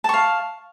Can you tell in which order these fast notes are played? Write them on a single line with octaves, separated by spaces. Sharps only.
A5 C#6 F5